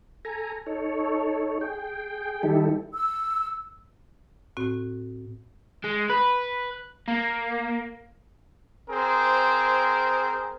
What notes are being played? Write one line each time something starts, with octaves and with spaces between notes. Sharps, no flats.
A4 G#5 A#5
D#4 A4 C#5
G#4 G5
D#3 G3 D#4 E4 G4 A4
E6
A2 C4 F#4
G#3
B4
A#3
C4 G#4 A#4 C5